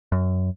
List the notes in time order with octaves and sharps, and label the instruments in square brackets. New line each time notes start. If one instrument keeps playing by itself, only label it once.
[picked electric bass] F#2